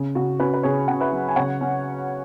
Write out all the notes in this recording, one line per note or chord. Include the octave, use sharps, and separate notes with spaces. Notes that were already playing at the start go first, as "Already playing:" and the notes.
Already playing: C#3
C#3 F#4
C#4 F#4 B4
B4
C#3 G#4 C#5
C#3 F#5
B4 E5
F#3
G#5
C#3 C#5 F#5
C#4